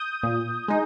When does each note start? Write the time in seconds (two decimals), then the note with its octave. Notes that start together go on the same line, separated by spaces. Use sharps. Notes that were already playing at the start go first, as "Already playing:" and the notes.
Already playing: D#6 G6
0.23 A#2
0.68 G#3 D#4